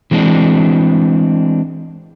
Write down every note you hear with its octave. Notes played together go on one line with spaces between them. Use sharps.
E3 G#3 C4 D4